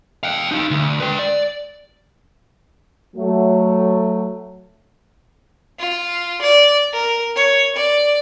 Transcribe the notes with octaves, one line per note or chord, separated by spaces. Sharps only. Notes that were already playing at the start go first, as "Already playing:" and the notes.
F5 G5
D#4 F5
D2
B4 G5
D5
F#3 A3
F4
D5
A#4
C#5
D5